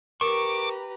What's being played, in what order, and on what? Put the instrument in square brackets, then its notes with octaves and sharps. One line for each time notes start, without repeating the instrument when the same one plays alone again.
[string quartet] G4 B4 A#5 [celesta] A#4 E7 [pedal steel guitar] C#6 [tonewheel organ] D6